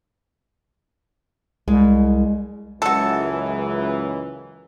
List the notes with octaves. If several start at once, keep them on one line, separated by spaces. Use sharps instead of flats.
C2 G#3
C#2 F#2 E3 F#4 A4